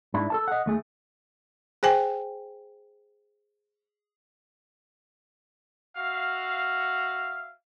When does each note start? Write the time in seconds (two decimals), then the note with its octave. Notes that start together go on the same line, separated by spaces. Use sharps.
0.14 G#2 D4 E4
0.30 A4 A#4 A5
0.48 D#5 F#5
0.66 D#2 A3 G#4
1.83 G#4 C5 G5 G#5
5.96 F#4 E5 F5